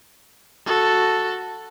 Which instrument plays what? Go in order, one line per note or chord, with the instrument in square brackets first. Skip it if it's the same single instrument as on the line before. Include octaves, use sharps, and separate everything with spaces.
[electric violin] F#4 A4